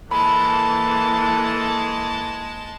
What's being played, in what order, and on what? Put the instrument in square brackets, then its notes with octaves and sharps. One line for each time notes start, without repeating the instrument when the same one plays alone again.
[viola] E3 A#3 [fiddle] G#3 A5 [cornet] A4 [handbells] B5